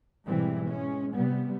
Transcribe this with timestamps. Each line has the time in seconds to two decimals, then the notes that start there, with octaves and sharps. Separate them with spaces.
0.25 G#2 B2 E3 G3 C4
0.67 G#3 C#4
1.14 C3 G3 B3